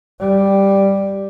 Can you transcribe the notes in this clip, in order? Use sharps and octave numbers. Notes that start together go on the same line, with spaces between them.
G3